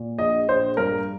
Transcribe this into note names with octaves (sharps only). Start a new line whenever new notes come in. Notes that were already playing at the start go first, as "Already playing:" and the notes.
Already playing: A#2
A#1 D#5
A#1 C5
G2 A#4